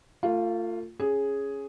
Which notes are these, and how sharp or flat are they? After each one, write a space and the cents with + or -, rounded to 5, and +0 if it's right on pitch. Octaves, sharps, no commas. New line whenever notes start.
A3 +40 F4 +0
C#4 -5 G#4 +0